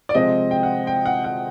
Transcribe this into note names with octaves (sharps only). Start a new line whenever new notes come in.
D5
C3 F3 G#3 C4 D#5
G5
F#5
G5
F#5
F#5